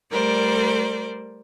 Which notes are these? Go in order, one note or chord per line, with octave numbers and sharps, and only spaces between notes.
G3 A3 A#4 C5 D5